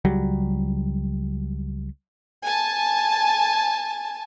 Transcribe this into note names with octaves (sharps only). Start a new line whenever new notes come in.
C#2 F#3 G3
G#5 A5